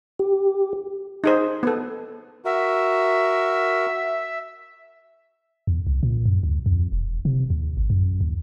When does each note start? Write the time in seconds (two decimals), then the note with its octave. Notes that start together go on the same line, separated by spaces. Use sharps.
0.19 G4
1.24 D#4 G#4 C5
1.63 B3 A4
2.45 F#4 A#4 E5
5.67 E2
5.87 C2
6.03 A#2
6.25 F#2
6.43 D2
6.66 F2
6.92 E1
7.25 C3
7.50 D#2
7.77 G#1
7.90 F#2
8.21 D#2